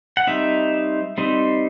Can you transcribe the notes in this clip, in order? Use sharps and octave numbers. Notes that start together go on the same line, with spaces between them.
F#5
G3 C4 D#4 E5
G3 C4 D#4